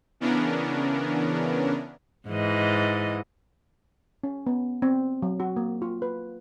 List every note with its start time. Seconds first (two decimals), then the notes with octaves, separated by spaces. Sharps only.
0.20 C#3 E3 B3 C#4 D4 A#4
2.28 G#2 E3 D#5
4.23 C#4
4.47 B3
4.82 C4
5.22 F#3
5.40 F#4
5.56 A#3
5.82 F4
6.02 B4